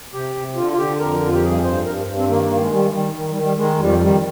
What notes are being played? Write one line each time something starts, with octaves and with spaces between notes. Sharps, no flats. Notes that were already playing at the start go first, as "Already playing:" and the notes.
C3 G4
C3
D3 F4
F4
D3 G4
F2 A#4
F2
F4
G4
G2 G#4
G2 C5
G2 A#4
G2
C4
D#3 A#3
D#3
G#3
D#3 G3
D#3 G3
D#3
G3
D#3
G3
D#3 G#3
F2 G3
D#3 G3